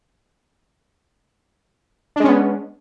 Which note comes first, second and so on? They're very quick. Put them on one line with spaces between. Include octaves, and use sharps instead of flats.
D4 G#3 C#4 B3